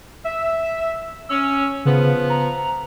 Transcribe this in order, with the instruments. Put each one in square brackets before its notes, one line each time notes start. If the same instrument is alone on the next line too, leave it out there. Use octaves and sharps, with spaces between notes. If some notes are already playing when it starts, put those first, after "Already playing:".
[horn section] E5
[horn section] C#4 [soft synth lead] E6
[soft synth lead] C#3 [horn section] F3 B3
[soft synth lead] A#5